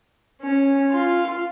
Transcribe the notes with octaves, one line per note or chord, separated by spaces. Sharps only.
C#4
F4